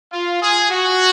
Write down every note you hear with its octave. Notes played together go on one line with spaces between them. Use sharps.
F4
G#4
F#4